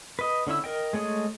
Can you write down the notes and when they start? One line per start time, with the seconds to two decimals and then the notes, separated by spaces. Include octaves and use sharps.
0.19 B4 D#5
0.47 D3 C#4 E4 E6
0.64 A#4 D#5 G5
0.93 G#3 A3 G#4 C#5 D#5